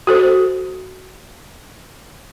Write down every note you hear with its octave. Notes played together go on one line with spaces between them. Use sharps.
F#4 A4 C5